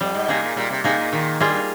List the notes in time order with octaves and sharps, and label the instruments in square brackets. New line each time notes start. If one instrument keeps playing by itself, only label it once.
[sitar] F2 [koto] G3
[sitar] G#2
[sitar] C3 [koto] A#3 D#4 G#4
[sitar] A#2
[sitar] A#2 [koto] G3
[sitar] C3
[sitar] C3 [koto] A#3 D#4 G#4
[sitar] A#2
[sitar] A#2 [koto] D#3
[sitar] G2 [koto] G3 A#3 F4 G#4